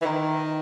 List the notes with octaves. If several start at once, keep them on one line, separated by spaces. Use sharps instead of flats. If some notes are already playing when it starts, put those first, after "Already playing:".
E3
D#3